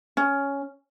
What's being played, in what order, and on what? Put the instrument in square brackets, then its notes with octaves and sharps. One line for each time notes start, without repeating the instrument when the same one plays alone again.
[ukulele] C#4